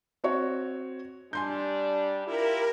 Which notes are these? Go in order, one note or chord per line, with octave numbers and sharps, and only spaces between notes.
C4 F#4 C#5
G3 D4 G#5 C6 G6
E4 F4 G4 A#4